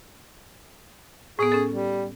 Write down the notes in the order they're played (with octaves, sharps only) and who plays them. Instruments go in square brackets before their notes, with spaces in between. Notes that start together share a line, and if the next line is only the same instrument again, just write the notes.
[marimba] A2 B3 [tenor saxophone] G#4
[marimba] C#4 A4
[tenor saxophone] G3